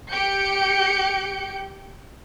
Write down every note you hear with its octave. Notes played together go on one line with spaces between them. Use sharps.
G4 G6 C#7 D7